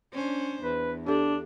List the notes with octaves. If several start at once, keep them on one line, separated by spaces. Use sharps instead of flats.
C#4 D4 C5
E2 B4
D4 G4 A4